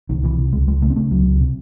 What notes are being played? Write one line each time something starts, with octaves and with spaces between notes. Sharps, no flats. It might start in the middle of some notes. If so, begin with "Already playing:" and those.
C2 D#3
C3 E3
C3
C#2 G#3
C#2 G#3
C#3 A3
C4
C#3 A3
C#2 F#3
C#2
C3